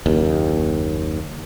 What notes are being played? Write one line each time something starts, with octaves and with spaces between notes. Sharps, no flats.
F#1 D#2